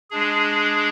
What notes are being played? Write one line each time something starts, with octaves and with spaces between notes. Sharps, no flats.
G#3 D4 G#4